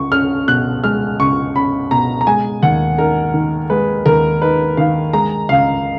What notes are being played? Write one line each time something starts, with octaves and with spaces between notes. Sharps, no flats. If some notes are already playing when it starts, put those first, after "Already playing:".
Already playing: C#2 C#6
C#4 F6
B2 F#6
G#3 F6
C#2 C#6
C#4 B5
B2 A#5
A#5
G#3 G#5
D#2 F#5
D#4 A#4
D#3
G#3 B4
D#2 A#4
D#4 B4
D#3 F5
G#3 A#5
C#2 F5